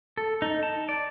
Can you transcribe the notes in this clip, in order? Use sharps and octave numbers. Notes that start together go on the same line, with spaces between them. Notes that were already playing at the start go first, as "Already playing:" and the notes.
A4
D#4
A5
D5